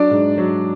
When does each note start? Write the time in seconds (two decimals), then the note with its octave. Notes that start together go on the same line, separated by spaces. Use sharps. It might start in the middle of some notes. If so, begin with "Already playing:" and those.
Already playing: F#3 D4 D5
0.10 G#2
0.38 F#3